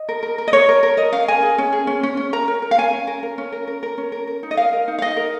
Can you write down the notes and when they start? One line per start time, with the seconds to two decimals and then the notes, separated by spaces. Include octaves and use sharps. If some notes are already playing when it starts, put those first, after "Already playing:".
Already playing: D#5
0.09 A#4
0.23 A#4
0.38 A#4
0.48 D#5
0.53 A#4 C#5
0.68 A#4
0.83 A#4
0.97 A#4 D#5
1.13 C#4 F5
1.28 A#4 G#5
1.43 G#4
1.58 C#4
1.73 G#4
1.87 C#4
2.03 C#4
2.17 C#4
2.33 A#4 A#5
2.48 A#4
2.62 A#4
2.71 F5
2.78 C#4 G#5
2.93 C#4
3.07 A#4
3.23 A#4
3.38 C#4
3.52 A#4
3.67 A#4
3.83 A#4
3.98 C#4
4.12 A#4
4.27 A#4
4.43 D#4
4.51 D#5
4.57 A#4 F5
4.73 A#4
4.88 D#4
4.99 F5
5.02 D#4 D#5
5.17 A#4